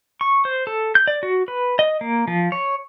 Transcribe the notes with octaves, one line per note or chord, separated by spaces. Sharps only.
C#6
C5
A4
G6
D5
F#4
B4
D#5
A#3
F3
C#5